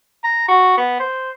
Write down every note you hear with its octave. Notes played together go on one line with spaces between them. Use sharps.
A#5
F#4
B3
C5